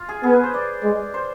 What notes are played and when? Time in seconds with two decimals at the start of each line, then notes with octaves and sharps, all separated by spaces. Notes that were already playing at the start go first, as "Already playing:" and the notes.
Already playing: F4
0.09 G#4
0.23 B3 G#4
0.33 B4
0.43 C5
0.54 D5
0.83 G#3
1.14 C5